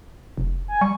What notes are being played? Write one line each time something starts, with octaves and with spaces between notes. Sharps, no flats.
F1
G#5
G3 C#6